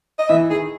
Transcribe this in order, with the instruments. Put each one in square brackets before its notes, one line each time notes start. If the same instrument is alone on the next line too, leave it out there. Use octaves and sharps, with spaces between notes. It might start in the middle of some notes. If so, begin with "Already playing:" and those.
[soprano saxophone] D#5
[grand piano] E3 [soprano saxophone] E5
[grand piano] D#3 [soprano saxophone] G#4